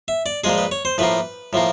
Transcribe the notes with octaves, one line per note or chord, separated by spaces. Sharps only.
E5
D5
A#2 F3 G#3 G#4
B4
C#5
C5
A2 F3 A#3 B4
A2 F3 A#3